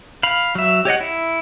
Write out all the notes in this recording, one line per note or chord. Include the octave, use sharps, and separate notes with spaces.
F5 B5
F#3 E5
G4 C#5 D#5 F#5
E4